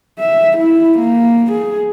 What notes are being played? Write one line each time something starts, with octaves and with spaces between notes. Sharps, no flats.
E5
E4
A#3
G#4